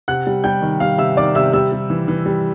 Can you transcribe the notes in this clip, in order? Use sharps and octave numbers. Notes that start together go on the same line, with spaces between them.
C3 F#5 F#6
G3
G3 G5 G6
D#3
G3 F5 F6
C3 E5 E6
D#3 D5 D6
C3 E5 E6
G3 E5 E6
G3
E3
E3
G3